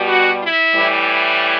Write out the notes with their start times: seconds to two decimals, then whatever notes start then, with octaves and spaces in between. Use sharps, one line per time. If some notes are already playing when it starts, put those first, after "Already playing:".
Already playing: B2 G3
0.09 F#4
0.42 E4
0.75 A2 E3 G3